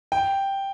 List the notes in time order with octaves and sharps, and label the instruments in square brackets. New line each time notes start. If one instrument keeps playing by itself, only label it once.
[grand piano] G5